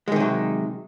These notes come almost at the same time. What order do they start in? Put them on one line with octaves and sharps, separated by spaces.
G#3 D#3 C3 F#3